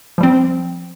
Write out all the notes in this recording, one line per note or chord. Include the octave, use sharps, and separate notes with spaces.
F3 G3 C4